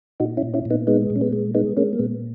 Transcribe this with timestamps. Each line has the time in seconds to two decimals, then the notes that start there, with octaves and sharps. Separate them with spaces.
0.20 A#2 D#4 F#4
0.37 C#4 E4
0.42 A#2
0.54 C#4 E4
0.65 A#2
0.71 B3 D#4
0.87 G#3 B3 D#4
1.10 A#2
1.16 C#4
1.21 G#3 B3
1.33 G#3
1.55 G#3 B3 D#4
1.77 G#3 A#3 C#4
1.93 A#3
1.99 A#2 G#3 B3